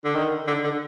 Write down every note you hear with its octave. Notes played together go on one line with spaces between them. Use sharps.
D3
D#3
D3
D3